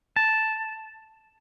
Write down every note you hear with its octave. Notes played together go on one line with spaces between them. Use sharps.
A5